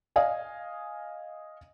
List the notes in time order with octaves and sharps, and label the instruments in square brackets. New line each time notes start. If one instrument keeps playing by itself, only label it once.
[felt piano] D#5 F5 G#5